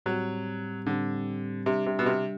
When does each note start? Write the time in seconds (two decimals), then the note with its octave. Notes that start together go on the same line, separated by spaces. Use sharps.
0.06 A2 F#3 G3 C4 G4
0.86 A2 D3 G3 C4 G4
1.66 C3 G3 D4 G4
1.86 C3
1.99 B2
2.06 C3